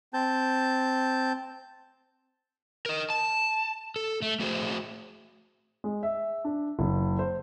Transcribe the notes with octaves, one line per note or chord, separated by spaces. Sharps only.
C4 A5 G6
A#4 D#5
A5
A4
A3
A3 F#4 G#4 C5
G#3
E5
D4
F#1
C5